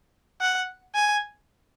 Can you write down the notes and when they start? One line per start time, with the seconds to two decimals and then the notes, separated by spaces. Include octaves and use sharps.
0.41 F#5
0.95 G#5